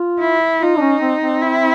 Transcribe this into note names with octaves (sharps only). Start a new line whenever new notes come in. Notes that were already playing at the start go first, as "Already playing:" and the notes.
Already playing: F4
E4
D#4 F4
D4
C#4
C4
C4
E4